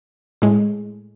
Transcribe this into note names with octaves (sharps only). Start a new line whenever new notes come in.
A2 G#3